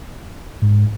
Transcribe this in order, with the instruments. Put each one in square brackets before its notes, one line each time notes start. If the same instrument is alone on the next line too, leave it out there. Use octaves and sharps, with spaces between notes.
[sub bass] G#2